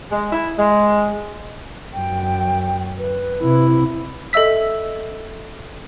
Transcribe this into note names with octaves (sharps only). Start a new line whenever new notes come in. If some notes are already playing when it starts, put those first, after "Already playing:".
G#3
E4
G#3
F#2 G5
B4
C3 E4
A4 D#5 E5 E6 B6